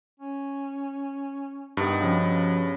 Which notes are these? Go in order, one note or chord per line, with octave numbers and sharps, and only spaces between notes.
C#4
G2 D#3 B3 F#5
C#3 F3 F#4